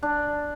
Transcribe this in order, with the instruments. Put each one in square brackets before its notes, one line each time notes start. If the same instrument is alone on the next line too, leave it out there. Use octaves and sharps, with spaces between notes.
[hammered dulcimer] D4